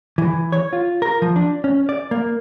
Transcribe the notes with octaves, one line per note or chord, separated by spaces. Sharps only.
E3
C#5
F4
A#4
F3
D4
C#4
D5
A#3